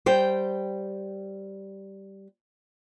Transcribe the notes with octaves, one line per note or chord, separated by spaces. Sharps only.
G3 C5 G5